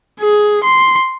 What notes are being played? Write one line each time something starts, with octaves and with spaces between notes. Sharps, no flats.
G#4
C6